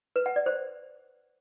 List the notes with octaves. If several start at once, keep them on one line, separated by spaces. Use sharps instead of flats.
B4
F#5
D5
C5